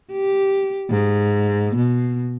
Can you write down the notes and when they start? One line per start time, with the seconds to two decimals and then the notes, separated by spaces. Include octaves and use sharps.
0.12 G4
0.90 G#2
1.76 B2